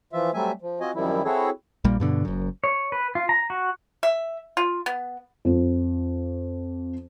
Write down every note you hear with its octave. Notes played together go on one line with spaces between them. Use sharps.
E3 F3 F4 E5
F#3 G3 A3 C4 E5 G#5
F3
C4 F4 F#4 D#5 G#5
F#2 D#3 F3 G3 C4 E4
C4 E4 F#4 G#4 A4 C#5
A#1 A#2 G3 A#3
G2 B2 D3
F#1 F#2
C#5
B4
F4
A#5
F#4
E5
F4
B3
F2 F3